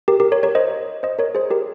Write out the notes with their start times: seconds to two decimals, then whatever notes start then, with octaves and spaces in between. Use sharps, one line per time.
0.08 G4 A#4
0.20 G4 A#4
0.32 A#4 C#5
0.43 A#4 C#5
0.55 C5 D#5
1.03 C5 D#5
1.19 A#4 C#5
1.35 G#4 C5
1.50 G4 A#4